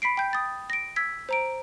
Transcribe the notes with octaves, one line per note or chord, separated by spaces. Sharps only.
B5 B6 C7 D7
G5 G6
D#6 A6
A#6 D7
E6 G#6 B6
C5 A#5 D7